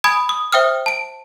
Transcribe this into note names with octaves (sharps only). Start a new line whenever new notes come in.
G#5 B5 D#6 G#6 D7
D#6
C5 E5 G5 D#6 F6
A5 D7